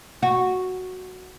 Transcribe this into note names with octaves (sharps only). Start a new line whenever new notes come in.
F#4